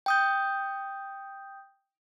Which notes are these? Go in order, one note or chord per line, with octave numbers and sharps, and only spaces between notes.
G5 D#6 G6